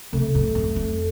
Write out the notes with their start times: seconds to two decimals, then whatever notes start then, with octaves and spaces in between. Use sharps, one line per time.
0.13 C3 A3
0.35 A2
0.55 F2
0.76 F2